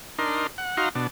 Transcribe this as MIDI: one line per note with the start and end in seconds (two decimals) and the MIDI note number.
0.19 0.47 62
0.19 0.47 63
0.19 0.47 70
0.19 0.47 84
0.58 0.77 78
0.77 0.89 63
0.77 0.89 66
0.77 0.89 77
0.77 0.89 82
0.77 0.89 84
0.95 1.07 47
0.95 1.07 62